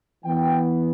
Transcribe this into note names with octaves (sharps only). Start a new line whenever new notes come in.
E3 B3 G5